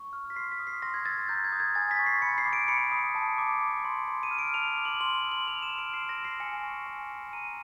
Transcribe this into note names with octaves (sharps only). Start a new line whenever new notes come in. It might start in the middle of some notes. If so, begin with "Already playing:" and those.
Already playing: C#6
F6
B6
C6 C7
B6
D#6
C7
C6 A#6
G#6
E6 A6
A#5 G6
G#6
D#6
G#6
G#5 A6
B6
C#6
C7
B5 C#7
C7
D6
D7
B5 C#7
D#6
A5
D6
A5
C6
C6
D#7
F6
D7
A5 F7
D6
F#7
C6 F#7
E6
F#7
C6 F7
E7
F6
D7
C6 C7
A#6
E6
C7
G#5 C#7
C#6
G#5
B5
A#5 D#7